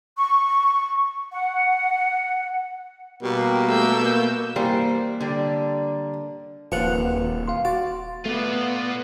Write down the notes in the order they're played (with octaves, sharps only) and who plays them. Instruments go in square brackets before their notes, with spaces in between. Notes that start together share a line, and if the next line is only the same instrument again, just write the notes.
[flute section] C#6
F#5
[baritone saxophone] B2 [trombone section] G3 A#3 [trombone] G4
[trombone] A3 [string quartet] E6 G6
[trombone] A#3
[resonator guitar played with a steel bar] E3 G3 C5 [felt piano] A#3
[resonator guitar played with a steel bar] D3 G3
[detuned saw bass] D#1 [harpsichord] D#2 F4 C#6 [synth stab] F3 F#5 [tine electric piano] B4
[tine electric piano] F5 C6
[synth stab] F#4 [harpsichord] D5
[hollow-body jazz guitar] A3 [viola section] B3 [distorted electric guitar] F4 D5